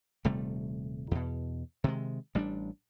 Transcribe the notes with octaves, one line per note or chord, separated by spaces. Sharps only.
D#1 C3 G3 A3
E2 B2
C3 D#3 F#3 G#3
A1 G3 G#3 D4